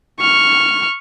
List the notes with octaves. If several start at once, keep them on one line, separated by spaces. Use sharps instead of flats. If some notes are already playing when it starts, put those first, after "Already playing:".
C#6 F6